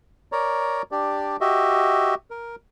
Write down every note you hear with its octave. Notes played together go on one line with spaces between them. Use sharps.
A#4 C#5 D5 A#5
D4 G4 D5
F#4 G4 D#5 E5
A#4